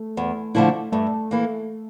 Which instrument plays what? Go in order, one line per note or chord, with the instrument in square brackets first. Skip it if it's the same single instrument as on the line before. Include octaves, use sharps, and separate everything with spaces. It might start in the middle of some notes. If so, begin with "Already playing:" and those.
Already playing: [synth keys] A3
[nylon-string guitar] E2
D3 F3 A3 E4
[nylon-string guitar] G2 [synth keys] A3
[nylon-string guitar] E3 A#3